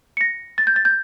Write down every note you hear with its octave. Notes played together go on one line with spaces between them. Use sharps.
C#7
A#6
A6
G6
A6
G6